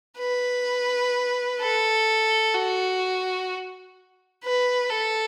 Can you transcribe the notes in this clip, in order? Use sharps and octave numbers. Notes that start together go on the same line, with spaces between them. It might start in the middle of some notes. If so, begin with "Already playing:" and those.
B4
A4
F#4
B4
A4